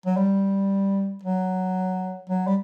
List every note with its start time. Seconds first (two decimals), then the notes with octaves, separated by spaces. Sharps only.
0.06 F#3
0.17 G3
1.23 F#3
2.29 F#3
2.47 G3